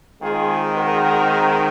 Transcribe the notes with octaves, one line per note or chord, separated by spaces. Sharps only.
D#3 G#3 C4 F4 G#4
F#4 A#4